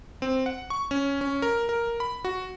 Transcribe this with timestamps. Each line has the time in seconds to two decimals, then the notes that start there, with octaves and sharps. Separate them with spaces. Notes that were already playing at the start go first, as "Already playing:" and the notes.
0.22 C4
0.46 F#5
0.70 C#6
0.91 C#4
1.21 C#4
1.42 A#4
1.69 A#4
2.00 B5
2.25 F#4